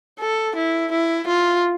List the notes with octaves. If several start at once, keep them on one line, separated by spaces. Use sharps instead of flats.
A4
E4
E4
F4